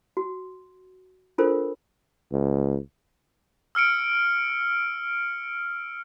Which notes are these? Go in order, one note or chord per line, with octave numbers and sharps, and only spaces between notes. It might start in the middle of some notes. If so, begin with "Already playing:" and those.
F#4
D4 F4 A4 A#4 C5
C#2
E6 F6 C#7 D7